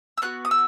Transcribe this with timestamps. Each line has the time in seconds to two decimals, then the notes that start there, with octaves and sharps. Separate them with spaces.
0.18 E6
0.22 B3 F#4 F#6
0.45 D#6
0.51 E6